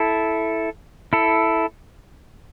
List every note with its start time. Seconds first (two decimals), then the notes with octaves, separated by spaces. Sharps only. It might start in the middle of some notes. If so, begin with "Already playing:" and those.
Already playing: E4 A4
1.13 E4 A4